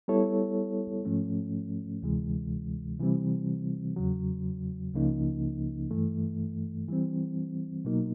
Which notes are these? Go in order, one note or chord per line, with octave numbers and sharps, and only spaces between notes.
G3 B3 E4 A4 C#5
G#2 F3 A3 C#4
D2 C3 E3 G#3
C3 E3 G3 C4
E2 C#3 F#3
C#2 C#3 F3 A#3 D#4
G2 E3 A3
E3 G3 C4
B2 F#3 A#3 D#4